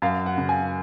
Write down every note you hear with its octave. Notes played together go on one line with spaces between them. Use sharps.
F#2 F5
F#5
C#3
G#5